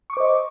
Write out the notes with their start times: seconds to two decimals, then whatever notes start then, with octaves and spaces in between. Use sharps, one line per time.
0.10 C#6
0.13 D6
0.17 C5
0.20 D#5